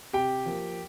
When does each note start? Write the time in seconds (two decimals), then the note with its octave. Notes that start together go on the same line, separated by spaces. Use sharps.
0.13 C3 G4 G5
0.46 F3 A#3